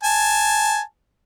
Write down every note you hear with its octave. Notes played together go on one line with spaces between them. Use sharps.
G#5 A5